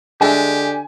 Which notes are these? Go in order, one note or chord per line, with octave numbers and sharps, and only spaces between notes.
D3 G#3 D4 G4 E5 G#5